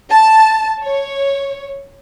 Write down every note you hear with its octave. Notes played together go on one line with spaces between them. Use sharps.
A5
C#5